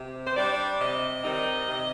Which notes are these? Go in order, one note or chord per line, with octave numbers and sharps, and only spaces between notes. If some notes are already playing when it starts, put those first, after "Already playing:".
Already playing: C3
C5
G3 D4 D5
C3 D#5
D#3 G3 C4 D#4
C3